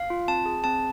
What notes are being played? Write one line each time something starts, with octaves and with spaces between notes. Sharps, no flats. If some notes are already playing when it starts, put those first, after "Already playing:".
Already playing: F5
F4
C4 A5
G#4
C4 A5